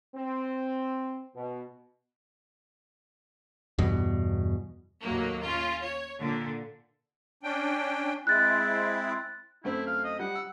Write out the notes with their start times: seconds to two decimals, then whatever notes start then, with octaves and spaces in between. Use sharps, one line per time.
0.15 C4
1.36 B2
3.79 E2 G2 B2
5.03 D#2 A2 F#3 A#3
5.43 C#4 F4
5.83 C#5
6.19 A#2 D3
7.43 C#4 D4 G5
8.27 G#3 C4 E4 F#6 A6
9.64 F#2 A3 C4 E4
9.87 F5
10.04 D#5
10.19 G3 F#5
10.35 E6